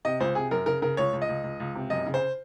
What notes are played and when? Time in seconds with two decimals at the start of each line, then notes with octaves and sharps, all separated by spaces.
0.05 C3 D#5
0.20 C#2 C5
0.35 C3 G#4
0.51 F#2 A#4
0.66 C#3 A#4
0.82 C#3 A#4
0.97 C#2 C#5
1.13 C#2
1.22 D#5
1.29 C#2
1.44 C#2
1.60 C#2
1.75 C3
1.90 F#2 D#5
2.06 C#3
2.14 C5